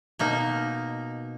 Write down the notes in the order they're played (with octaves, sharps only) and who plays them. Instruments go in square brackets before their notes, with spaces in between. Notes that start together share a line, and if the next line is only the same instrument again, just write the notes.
[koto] B2 A#3 D#4